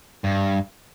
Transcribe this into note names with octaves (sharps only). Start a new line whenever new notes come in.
G2